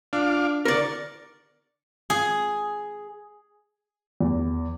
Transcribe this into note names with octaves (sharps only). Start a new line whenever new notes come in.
D4 F4 F5 D6
D3 A#4 D5 C#6
G#4
E2